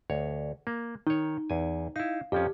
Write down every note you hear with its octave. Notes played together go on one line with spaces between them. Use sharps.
D2 C#5
A#3
D#3 D#4 C#5
E2 G#5
D#4 E4 F5
F2 F3 C#4 G4